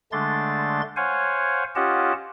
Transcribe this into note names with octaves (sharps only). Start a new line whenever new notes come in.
D3 G#3 A3 D4 C6 A6
C5 C#5 F5 F#5 G#5
C#4 F4 G4 D#5 F#5 A5